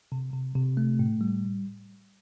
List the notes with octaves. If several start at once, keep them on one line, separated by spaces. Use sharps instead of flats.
C3
C3
C3
A3
A2
G3